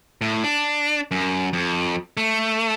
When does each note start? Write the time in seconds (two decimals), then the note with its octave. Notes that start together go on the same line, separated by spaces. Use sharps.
0.21 A2
0.44 D4
1.11 F#2
1.53 F2
2.17 A3